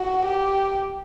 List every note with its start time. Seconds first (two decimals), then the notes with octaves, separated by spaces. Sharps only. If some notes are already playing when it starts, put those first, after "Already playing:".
Already playing: F#4
0.25 G4